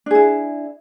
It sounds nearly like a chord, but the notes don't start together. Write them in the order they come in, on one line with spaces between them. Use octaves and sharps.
D4 G#4 E4